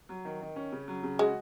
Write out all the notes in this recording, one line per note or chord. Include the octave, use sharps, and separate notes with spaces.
F#3
D#3
D#3
C#4
C#3
F#3
C#3
G#3 F#4